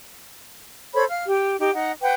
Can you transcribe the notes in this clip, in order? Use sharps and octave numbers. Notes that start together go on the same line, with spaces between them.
A4 C5 C#5 B5
F5 F6
G4
D#4 G4
D#4 F#5
B4 F#5 G5